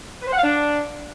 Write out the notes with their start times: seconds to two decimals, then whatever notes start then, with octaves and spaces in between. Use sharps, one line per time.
0.22 B4
0.27 C5
0.33 F#5
0.38 F5
0.44 D4